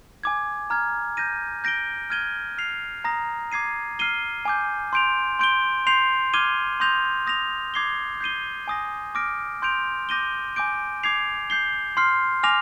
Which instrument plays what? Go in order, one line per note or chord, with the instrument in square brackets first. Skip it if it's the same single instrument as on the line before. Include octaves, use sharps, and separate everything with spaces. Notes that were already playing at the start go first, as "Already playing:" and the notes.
[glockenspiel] G#5 D6 G#6
A#5 F6 G#6
G6 A#6 D#7
G6 A#6 D7 G7
F6 G#6 D#7 G7
F6 C7 F7
A#5 D#6 A#6
D6 G#6 C7 D#7
F6 C7 D#7 G7
G#5 D6 G6
C6 G6 D7 F7
C6 G6 D7 G7
C6 G6 C7 F7
D6 F6 G#6 D#7 G7
C6 D#6 G6 A#6 F7
D#6 A#6 F7
D6 G#6 C7 G7
G6 C7 D#7 G7
G#5 D#6 A#6
D6 F6 A#6 D7
C6 G6 D7 F7
D6 G6 A#6 D#7 G7
G#5 D6 G6 D7
D6 G#6 C7 F7
G6 C7 G7
C6 F6 C7
G#5 D6 F6 A#6 F7